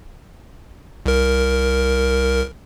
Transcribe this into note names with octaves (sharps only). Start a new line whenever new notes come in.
C2 A#4